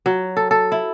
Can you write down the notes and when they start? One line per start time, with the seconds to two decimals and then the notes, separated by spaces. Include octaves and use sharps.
0.06 F#3
0.37 A4
0.51 A4
0.72 E4